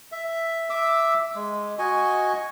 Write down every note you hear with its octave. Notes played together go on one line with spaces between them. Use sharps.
E5
E5 D6 E6
G#3
F#4 D#5 G#5 C#6